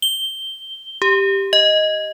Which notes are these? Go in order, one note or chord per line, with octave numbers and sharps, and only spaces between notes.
G7
G4
D#5